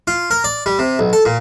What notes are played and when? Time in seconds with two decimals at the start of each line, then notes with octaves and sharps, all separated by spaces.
0.07 F4
0.31 A#4
0.44 D5
0.66 G3
0.79 C3
0.99 B1
1.13 A4
1.25 A#2